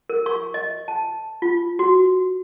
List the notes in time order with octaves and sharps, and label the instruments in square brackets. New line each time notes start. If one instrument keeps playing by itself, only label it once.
[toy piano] A#4
C#6
D#5
A5
F4
F#4